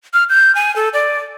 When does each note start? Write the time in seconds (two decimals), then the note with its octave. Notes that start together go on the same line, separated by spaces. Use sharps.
0.13 F6
0.29 G6
0.55 G#5
0.76 A4
0.93 D5